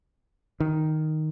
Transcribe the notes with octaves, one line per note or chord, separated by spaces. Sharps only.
D#3